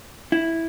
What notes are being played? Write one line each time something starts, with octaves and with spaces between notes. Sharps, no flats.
E4